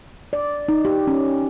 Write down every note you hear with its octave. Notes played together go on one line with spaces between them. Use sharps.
D5
D#4
G4
C#4